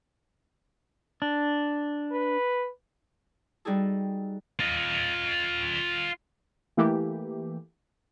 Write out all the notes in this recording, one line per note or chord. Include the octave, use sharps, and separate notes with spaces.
D4
B4
G3 D#4 F#4 G#4 A4
F4 D#5
E3 A3 A#3 G4